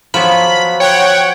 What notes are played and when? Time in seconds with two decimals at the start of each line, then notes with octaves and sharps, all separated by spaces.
0.14 F3 F#3 B3 B5
0.80 C#5 F#5 G5